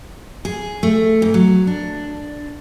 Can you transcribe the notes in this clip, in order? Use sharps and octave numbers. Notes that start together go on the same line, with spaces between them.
G#4
A3
G#2
F#3
D4